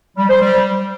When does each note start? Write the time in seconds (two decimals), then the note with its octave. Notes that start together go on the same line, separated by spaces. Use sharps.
0.17 G3
0.29 C5
0.40 G3